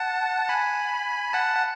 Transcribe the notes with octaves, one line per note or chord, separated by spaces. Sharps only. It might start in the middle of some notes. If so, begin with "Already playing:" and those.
Already playing: F#5 A5
G#5 B5
F#5 A5
F#5